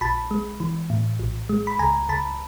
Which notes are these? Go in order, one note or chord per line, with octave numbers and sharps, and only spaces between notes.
A#1 A5 B5
G#3
E3
A2
A#1
G#3
B5
C#2 G#5 A#5
C#2 A5 B5